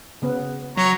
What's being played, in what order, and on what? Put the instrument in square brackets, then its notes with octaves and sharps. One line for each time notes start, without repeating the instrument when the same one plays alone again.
[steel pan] C#3 B3
[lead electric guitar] F#3 [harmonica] C#5 A#5